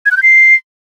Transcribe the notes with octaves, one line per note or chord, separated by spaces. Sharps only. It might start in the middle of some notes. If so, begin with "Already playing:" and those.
G#6
F#6
G6
C7